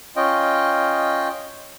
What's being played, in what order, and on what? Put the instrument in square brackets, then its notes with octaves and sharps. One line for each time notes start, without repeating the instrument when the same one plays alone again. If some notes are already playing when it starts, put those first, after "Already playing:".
[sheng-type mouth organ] C#4 F4 D#5 G5